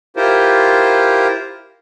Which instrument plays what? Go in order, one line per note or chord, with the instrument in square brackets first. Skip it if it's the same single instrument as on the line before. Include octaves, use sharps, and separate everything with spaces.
[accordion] E4 F4 G4 A#4 C5